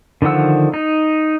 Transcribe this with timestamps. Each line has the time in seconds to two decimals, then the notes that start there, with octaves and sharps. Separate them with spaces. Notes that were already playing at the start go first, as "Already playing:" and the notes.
0.22 D3 D#3 F3 F#5 E6
0.74 D#4